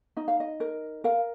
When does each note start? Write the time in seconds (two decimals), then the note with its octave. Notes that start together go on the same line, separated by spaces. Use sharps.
0.17 D#4 D#5
0.28 F5
0.40 D#5
0.60 A#4
1.04 A#4 F5